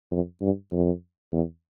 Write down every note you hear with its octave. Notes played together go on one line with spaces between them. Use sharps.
F2
G2
F2
E2